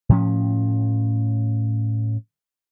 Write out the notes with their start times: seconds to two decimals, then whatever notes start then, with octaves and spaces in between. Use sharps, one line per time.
0.09 A2 F3 C#4